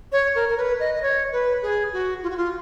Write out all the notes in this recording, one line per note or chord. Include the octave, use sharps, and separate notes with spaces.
C#5
A#4
A#4
B4
D#5
D#5
C#5
B4
G#4
F#4
F4
F#4
F4